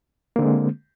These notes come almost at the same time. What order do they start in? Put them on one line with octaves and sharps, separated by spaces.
A#3 D3 C4 G#3